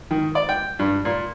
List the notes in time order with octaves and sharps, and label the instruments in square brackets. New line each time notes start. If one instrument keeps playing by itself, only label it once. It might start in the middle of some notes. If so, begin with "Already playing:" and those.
[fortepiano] D#3
D5
G5
G2
A#2